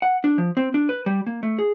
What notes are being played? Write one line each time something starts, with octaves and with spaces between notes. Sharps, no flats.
F#5
D4
F3
C4
D4
B4
G3
A#3
A3
G#4